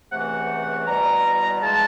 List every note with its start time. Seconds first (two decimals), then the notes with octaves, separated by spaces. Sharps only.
0.12 C#2 C3 E3 A3 F#5
0.87 E2 B2 G3 A#5
1.62 G#2 F3 G#3 A5